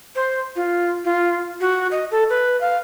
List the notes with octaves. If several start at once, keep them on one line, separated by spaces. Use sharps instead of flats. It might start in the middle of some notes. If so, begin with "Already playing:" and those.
C5
F4
F4
F#4
D#5
A4
B4
F5